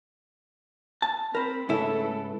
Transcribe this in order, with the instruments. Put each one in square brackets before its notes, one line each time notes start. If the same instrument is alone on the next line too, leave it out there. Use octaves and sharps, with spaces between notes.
[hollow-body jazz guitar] A5
[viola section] C4 B5 [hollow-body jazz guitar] A#4 C5
[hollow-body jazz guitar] G#2 C#3 E4 [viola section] A3 A4 B4